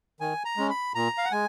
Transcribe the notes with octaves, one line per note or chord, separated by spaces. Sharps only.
D#3 G#5
A#5
G#3 C#4
B5
A#2 A#5
F5
F#5
G#3 G#5